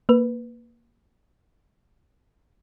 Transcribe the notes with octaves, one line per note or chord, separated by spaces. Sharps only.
A#3 B4